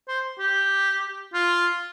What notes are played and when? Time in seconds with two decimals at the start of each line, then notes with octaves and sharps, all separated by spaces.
0.08 C5
0.39 G4
1.34 F4